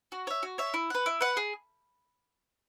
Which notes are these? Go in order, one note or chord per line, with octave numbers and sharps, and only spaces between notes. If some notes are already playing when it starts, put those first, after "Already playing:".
F#4
C#5 E5
F#4
C#5 E5
E4
B4 F#5
E4
B4 F#5
G#4